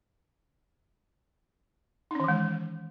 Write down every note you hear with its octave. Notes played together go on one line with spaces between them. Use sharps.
D#3 E3 G#3 C#4 D#4